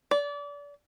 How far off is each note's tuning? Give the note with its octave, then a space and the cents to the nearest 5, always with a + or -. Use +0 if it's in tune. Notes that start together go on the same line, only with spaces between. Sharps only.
D5 -30